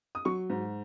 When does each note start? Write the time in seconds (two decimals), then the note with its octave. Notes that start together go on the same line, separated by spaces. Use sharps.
0.15 D#6
0.25 F#3 C#6
0.50 G#2